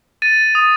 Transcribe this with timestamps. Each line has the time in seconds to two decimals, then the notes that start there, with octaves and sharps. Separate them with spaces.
0.22 A6 D#7
0.55 D#6